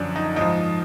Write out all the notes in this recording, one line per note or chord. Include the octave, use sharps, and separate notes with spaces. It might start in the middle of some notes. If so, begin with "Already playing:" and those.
Already playing: F#2 D3 F3 C#4 D4
D#4
G#2 F3 D#4